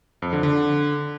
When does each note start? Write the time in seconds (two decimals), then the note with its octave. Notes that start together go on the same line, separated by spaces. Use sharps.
0.22 F2
0.33 D3
0.43 D3